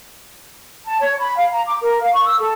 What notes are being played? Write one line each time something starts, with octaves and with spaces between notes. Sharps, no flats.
A5
C#5
B5
F5
A#5
D6
A#4
F5
C#6
E6
A4